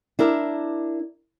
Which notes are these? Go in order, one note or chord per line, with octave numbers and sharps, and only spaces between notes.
D4 E4 A#4